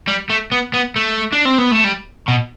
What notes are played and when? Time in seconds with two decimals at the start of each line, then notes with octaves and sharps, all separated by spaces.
0.08 G3
0.30 A3
0.52 B3
0.74 B3
0.96 A3
1.32 D4
1.45 C4
1.58 B3
1.71 A3
1.84 G3
2.28 B2